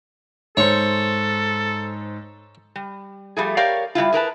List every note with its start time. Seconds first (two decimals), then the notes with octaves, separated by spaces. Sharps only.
0.57 G#2 A4 C5 C#5
2.76 G3
3.37 F3 G3 A3 G#4
3.57 G4 A#4 C#5 D5 F5
3.95 G3 G#3 E4 F4
4.13 G#4 A#4 B4 A5